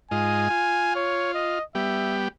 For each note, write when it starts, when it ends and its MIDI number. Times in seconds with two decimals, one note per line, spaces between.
0.11 0.48 44
0.11 0.48 65
0.11 0.48 75
0.11 0.92 80
0.50 1.59 65
0.95 1.33 73
1.34 1.63 75
1.75 2.28 55
1.75 2.28 59
1.75 2.28 67
1.75 2.15 76